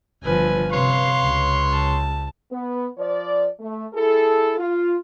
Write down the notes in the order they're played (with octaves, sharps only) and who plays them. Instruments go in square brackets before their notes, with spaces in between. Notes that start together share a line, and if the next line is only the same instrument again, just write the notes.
[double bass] G1 F3 [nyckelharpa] B4 G#5
[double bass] C3 [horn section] B4 C#5 C6 [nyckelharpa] F5
[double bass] C#2
[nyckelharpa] A5
[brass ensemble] B3
F3 C5 D5
A3
E4 G#4 A4
F4